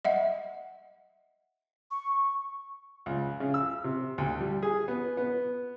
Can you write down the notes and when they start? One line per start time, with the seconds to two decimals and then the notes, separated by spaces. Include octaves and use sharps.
0.05 D#5 E5 F#5
1.91 C#6
3.06 C#2
3.40 C#3
3.54 E6
3.84 C3
4.18 D2
4.40 G3
4.63 G#4
4.88 B3
5.17 B3